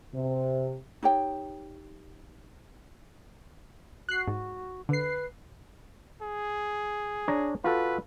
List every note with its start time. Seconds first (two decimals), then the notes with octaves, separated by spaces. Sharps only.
0.14 C3
1.03 D#4 G4 C#5 G5
4.09 F#4 F#6 C7
4.27 G#2
4.89 D3 B4 C7
6.21 G#4
7.28 D4 C#5 A#5
7.64 F4 F#4 A4 B4